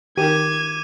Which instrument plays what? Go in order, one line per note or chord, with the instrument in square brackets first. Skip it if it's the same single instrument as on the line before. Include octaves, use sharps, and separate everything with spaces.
[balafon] D#3 D#4 A#4 [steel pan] G4 [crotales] D6 D#7 [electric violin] G#6